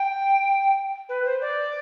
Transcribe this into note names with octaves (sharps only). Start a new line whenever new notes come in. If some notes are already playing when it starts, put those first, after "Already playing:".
Already playing: G5
B4
C5
D5